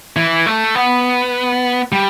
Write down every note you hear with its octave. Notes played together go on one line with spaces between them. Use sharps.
E3
A3
B3
G3